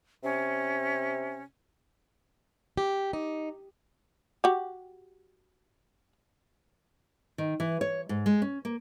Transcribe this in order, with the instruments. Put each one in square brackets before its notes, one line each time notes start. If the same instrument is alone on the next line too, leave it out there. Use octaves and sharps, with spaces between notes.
[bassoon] C3 [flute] C#4
[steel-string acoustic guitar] G4
D#4
[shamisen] F#4 G4
[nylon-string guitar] D#3
E3
C#5
G#2
G#3
C#4
A#3